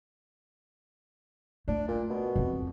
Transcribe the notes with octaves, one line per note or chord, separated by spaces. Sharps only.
A3 D4
A#2
B2
F2 D#3